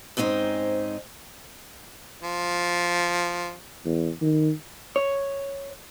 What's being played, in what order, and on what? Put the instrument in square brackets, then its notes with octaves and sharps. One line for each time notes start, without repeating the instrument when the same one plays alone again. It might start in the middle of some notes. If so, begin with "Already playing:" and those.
[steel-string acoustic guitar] G#2 C4 C#4 D#4 C5
[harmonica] F3
[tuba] E2
D#3
[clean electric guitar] C#5